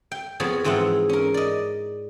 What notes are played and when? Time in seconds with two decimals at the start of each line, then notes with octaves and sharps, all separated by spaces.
0.12 G5
0.40 F3 B3 C4 G#4 C#5
0.64 G#2 E3 C4 F4 G#4 F#5
1.09 C#4 A#4
1.34 D5 D#5